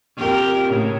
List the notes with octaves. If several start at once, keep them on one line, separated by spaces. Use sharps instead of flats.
F2 G4 A#4
A2 C#3